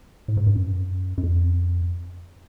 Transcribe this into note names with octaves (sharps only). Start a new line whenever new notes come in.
A2
G#2
G2
F#2
F#2
F2